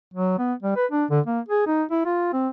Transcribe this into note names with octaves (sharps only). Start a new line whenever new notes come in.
F#3
B3
G3
B4
D4
D3
A#3
G#4
D#4
E4
F4
C4